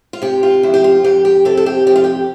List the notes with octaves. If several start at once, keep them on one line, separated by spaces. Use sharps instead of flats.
F4
C3 G4
F4
F2 E4
G4
F4
F2 G4
G4
C3 A4
A4
G4
F2 G4
F4
G4